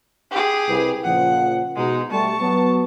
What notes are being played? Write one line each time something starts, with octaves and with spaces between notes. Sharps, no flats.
G4 G#4
C2 B4
A#2 C#3 F3 F#5
B2 G#3 D#4
G3 A3 A5 C#6
F#3 B3